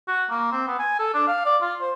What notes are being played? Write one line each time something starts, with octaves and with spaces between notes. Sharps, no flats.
F#4
A#3
C4
B3
G#5
A4
D4
F5
D5
F4
C5